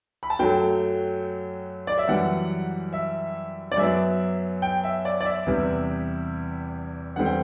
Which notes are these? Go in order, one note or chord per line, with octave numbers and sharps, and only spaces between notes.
B5
A5
F#2 F#3 A3 G5
D5
E5
F#2 E3 G3 F#5
E5
D5
F#2 F#3 B3 E5
G5
E5
D5
D5
E5
E2 C3 E3 G3
E2 D3 G3 C4 F#5
G5